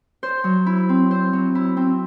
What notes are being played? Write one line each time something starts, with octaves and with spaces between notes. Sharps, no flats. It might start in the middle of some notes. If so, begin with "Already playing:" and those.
C5
F#3
E4
C4
C5
F#3
E4
C4